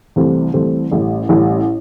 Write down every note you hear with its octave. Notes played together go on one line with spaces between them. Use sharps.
C2 C3 E3 A3 C4
C2 C3 E3 A3 C4
A1 A2 G3
A1 A2 G3